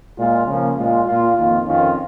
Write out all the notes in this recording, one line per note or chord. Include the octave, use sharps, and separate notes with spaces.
A#2 G#3 F4
C#3 F3 A#3
A#2 G#3 F4
A#2 A#3 F4
F2 D#3 A#3 F4
F2 D#3 C#4 F4